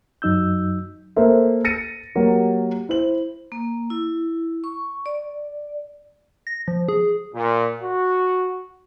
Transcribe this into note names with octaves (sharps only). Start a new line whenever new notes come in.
F#2 F#3 D#4 E6 G6
A#3 A4 C5 E5
A6 A#6 C#7 D#7
F#3 A#3 G4
E4 C5 F#7
A#3
E4
C#6
D5
A#6
F3
G#4
A#2
F#4